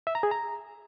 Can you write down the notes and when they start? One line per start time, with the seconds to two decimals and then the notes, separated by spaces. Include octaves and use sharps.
0.07 E5
0.15 A#5
0.23 G#4
0.31 A#5